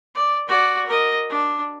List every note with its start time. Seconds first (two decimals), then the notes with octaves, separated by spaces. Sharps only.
0.15 D5
0.48 F#4 D5
0.87 A#4 D#5
1.30 D4